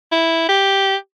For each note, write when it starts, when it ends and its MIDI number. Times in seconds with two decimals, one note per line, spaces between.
0.12 0.46 64
0.48 0.96 67